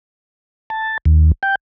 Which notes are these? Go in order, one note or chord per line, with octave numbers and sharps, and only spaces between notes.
A5
D#2
G5